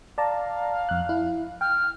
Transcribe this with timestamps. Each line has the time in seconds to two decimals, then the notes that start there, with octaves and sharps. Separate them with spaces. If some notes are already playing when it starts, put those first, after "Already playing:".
0.18 D5 F5 A5 A#5
0.89 F2 F#6
1.09 E4
1.61 G5 F6